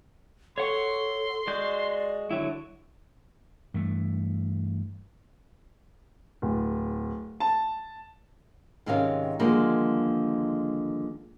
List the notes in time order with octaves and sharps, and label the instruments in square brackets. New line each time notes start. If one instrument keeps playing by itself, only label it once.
[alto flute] A4 [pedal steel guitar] C#5 F#5 C#6 [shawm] C6
[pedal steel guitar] G#3 F#4 G6 [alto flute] D5
[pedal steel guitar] D3 F#3 E4
[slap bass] G2 E3 A3
[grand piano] D1
A5
[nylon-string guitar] G#2 C3 D#3 C#4 B4 F5
D3 D#3 F3 G3 G#3 A#3